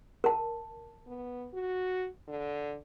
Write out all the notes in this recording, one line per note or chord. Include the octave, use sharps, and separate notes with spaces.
A#4 A5
B3
F#4
D3